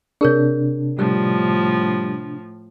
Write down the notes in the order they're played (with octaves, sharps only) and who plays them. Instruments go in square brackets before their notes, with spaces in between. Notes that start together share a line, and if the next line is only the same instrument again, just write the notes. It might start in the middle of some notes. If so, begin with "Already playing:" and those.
[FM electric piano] C3 D4 [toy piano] G#4 A#4 C#5
[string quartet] A2 F3 [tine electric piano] G3